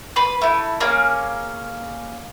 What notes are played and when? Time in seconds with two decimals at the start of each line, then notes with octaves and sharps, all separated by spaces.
0.16 B4 B5 C6
0.42 A3 E4
0.80 A#3 C#4 G#4